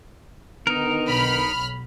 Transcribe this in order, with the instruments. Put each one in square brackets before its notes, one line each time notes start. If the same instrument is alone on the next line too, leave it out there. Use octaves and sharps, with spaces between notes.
[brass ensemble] D3 D#3 B3 [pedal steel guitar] D#4 A#4
[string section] B1 B5 F6